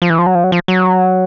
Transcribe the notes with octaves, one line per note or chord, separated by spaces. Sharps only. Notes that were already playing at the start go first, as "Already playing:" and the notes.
F3
E3
F3
F#3
F3
F#3
F3
F#3